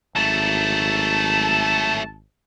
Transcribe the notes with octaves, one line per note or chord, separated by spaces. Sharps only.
G#1 F#3 A3 A5